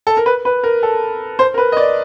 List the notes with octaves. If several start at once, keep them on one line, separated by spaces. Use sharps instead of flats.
A4
A#4
B4
B4
A#4
A4
C5
A#4
B4
D#5
D5